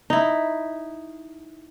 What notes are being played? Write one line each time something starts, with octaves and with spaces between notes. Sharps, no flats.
D#4 E4